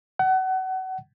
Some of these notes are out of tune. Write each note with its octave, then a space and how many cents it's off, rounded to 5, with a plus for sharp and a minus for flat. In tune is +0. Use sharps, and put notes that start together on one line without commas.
F#5 +30